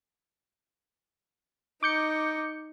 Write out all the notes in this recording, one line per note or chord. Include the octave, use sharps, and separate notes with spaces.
D#4 D6 G6 C#7